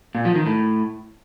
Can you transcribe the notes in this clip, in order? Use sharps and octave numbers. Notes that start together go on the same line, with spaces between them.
A#2
F3
D#3
A2